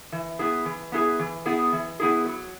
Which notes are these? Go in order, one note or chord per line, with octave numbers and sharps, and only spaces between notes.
E3
B3 E4 G#4
E3
B3 E4 G#4
E3
B3 E4 G#4
E3
B3 E4 G#4
F#3